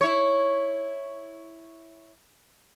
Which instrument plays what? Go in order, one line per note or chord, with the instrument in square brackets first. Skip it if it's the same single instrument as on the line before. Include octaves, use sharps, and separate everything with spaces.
[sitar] E4 C#5